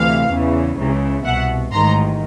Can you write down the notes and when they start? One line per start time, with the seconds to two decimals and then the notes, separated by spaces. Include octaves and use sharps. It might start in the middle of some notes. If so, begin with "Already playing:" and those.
Already playing: D2 C3 E3 F5
0.30 E2 C#3 E3
0.77 C#2 C#3 E3
1.25 C2 B2 E5 F#5
1.72 A1 G#2 D#3 A#5 C6